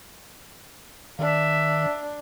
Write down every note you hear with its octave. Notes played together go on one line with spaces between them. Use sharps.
D#3 D4 E5